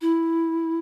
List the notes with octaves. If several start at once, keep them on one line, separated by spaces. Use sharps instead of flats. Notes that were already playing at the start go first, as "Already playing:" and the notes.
E4